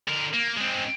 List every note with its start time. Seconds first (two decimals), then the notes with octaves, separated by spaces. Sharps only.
0.08 D3 A#4
0.34 A#3
0.58 G#3 C4